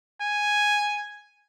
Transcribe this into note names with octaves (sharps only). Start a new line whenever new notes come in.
G#5